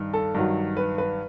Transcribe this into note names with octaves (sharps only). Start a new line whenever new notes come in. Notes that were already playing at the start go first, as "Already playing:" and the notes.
Already playing: G2 D#3
A4
G2 D#3 F#3
B4
B4